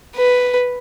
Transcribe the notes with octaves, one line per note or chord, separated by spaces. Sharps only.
B4